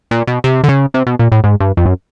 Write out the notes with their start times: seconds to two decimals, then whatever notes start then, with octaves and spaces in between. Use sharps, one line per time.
0.11 A#2
0.27 B2
0.44 C3
0.64 D3
0.69 C#3
0.94 C3
1.07 B2
1.19 A#2
1.32 A2
1.44 G#2
1.60 G2
1.77 F2
1.86 F#2